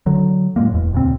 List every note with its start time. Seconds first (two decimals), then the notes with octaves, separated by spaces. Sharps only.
0.06 D3 F#3
0.56 A2 F#3 G#3 A#3
0.72 E1 E2
0.93 D2 A#2 C#3 C4